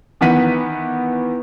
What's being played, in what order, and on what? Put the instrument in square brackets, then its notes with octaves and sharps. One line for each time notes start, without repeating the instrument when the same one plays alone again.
[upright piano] D#3 E3 B3 F#5 B6 D#7